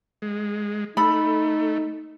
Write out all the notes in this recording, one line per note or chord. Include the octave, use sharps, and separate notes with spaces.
G#3
A3 D#4 A4 B5